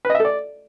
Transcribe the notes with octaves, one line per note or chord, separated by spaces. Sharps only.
B4
D#5
E5
A4
D5